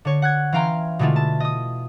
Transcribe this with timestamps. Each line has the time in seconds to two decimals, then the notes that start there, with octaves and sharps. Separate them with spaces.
0.05 D3 C#5
0.22 F#5 F#6 G#6
0.53 E3 C#4 F5 G5 A#5 C6
0.99 B2 D3 G#3 A3 E4 F4
1.16 A5
1.40 D#5 D#6